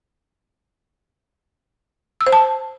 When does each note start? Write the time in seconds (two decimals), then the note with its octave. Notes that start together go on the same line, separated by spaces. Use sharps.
2.21 E6
2.27 C5
2.32 A5